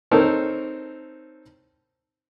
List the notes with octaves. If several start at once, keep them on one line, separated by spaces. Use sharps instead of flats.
C4 D#4 A4 A#4 C#5